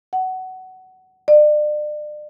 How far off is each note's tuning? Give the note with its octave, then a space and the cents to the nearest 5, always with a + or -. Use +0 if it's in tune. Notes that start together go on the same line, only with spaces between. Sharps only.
F#5 +15
D5 +35